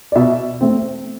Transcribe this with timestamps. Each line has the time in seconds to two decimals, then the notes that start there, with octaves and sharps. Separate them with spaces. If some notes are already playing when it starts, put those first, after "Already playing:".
0.12 D5
0.16 B2 E5
0.61 A3 C4